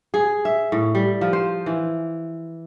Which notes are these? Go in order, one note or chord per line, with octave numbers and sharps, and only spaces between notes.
G#4
E5
A2
G3
F3
C5
E3